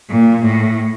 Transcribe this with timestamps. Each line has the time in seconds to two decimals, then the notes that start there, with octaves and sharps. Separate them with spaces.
0.10 A#2
0.44 A2